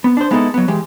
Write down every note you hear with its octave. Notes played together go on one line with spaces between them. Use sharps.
B3
D4 C5
G#3 B3 D#4 E4 G4 A4
F#3 B3
E3 G#3 G4